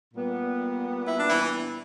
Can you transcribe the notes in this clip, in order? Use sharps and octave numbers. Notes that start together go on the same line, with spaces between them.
A#2 G3 B3
E4
D4
E3 E4